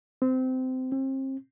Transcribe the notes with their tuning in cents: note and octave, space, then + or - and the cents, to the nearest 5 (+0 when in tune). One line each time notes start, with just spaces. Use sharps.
C4 -20
C4 +35